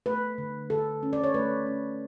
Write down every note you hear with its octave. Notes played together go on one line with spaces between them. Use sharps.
A3 B4
D3
D3 A4
C#4
D5
C#5
A3 B4
C#4